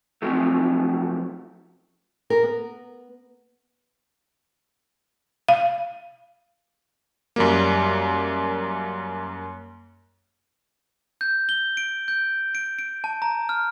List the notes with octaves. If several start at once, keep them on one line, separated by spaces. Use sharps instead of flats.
F2 A2 C3 F3 F#3 A3
A#4
B3
F5
F#2 G3 A#3
G6
G7
D7
G6
D7
D7
A5
A#5
F6